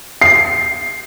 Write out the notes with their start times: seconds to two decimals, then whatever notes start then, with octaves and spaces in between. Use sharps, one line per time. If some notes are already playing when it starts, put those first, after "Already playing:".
0.21 C7